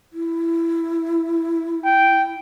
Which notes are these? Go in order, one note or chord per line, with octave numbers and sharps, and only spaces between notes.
E4
G5